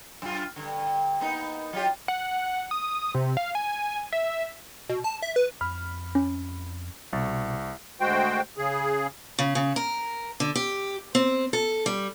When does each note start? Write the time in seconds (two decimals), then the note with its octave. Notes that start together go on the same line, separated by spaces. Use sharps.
0.22 F#2 F4
0.56 G2 D3
1.21 A#3 B3 D#4
1.73 F#3 F4 G4
2.08 F#5
2.71 D#6
3.14 C3
3.37 F5
3.55 G#5
4.13 E5
4.89 B2
5.04 A5
5.22 E5
5.36 B4
5.61 F2 B5 F6
6.15 C#4
7.13 C2 B2 A6
8.01 D2 G#3 F#4 C5 G5
8.57 C#3 G#4
9.39 C#3
9.55 C#3
9.76 A#4
10.40 D3
10.55 G4
11.15 C4
11.53 A4
11.86 G3